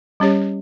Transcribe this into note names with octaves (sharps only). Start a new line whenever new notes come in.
G3 C#4 G4 C#5